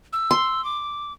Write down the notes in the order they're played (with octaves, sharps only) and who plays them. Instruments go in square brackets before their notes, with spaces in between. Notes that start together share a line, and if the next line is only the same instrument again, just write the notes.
[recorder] E6
[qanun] C6
[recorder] D6